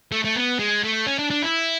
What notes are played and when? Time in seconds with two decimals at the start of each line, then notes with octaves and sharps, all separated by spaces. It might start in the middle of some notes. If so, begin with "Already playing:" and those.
0.12 A3
0.25 A3
0.35 B3
0.59 G#3
0.84 A3
1.07 C#4
1.19 D4
1.30 D4
1.43 E4